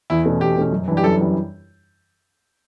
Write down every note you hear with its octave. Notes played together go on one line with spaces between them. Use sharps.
E2 E4
B2 A3 C#4
E2 G4
B2 A3 C#4
F#2
E3 G3 D4
G4
F#2 A4
E3 G3